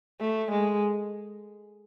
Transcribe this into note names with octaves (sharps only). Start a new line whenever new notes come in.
A3
G#3